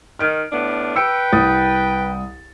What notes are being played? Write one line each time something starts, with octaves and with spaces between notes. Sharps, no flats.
D#3 F6 D7
A2 B3 D4
B4 G5 E6 C#7 D7
C2 D#6 A6